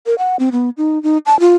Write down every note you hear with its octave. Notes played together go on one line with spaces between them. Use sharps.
A#4
F#5
C4
B3
D#4
D#4
A5
F4